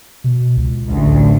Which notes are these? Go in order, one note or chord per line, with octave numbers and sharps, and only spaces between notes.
B2
C#2
A1 D2